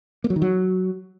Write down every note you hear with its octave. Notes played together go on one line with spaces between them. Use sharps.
A#3
F#3
D#3
F#3